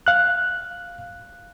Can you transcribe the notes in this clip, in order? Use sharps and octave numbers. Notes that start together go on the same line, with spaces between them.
F5 F#6